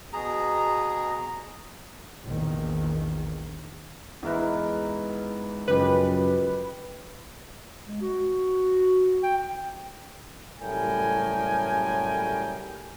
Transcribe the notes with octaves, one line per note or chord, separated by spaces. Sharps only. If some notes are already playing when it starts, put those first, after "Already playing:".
B2 G#4 A#5
A#1 E2 D#3
E2 G#2 E4 A#4 B4 E5
F#2 C#3 F3 G#3 G4 B4
G#3
F#4
G5
F#1 A2 G3 A#4 G5 G#5